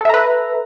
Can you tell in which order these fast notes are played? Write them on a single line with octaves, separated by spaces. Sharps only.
A4 E5 A#5 B4